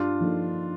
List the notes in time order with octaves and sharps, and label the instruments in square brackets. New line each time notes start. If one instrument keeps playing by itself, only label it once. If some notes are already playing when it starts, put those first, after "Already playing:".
Already playing: [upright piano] G2 [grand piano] D4 F4
[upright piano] F3 A#3 D#4 A4